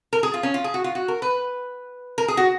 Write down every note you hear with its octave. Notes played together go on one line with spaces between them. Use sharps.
A#4
G#4
F4
C#4
F4
G#4
F#4
F4
F#4
A#4
B4
A#4
G#4
F#4